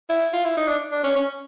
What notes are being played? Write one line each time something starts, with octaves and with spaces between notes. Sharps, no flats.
E4
F4
E4
D#4
D4
D4
C#4
C#4